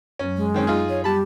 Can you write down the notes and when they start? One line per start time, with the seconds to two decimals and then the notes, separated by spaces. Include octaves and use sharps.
0.19 F#2 F#3 C#4
0.37 G#3
0.54 D#3 C4 C#4
0.67 D#4 F4 G#4
0.89 C#5
1.04 G3 G4 A5 B5